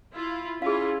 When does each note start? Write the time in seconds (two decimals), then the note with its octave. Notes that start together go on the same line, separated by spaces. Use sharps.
0.13 E4 F4
0.62 C#4 E4 F4 G#4 F5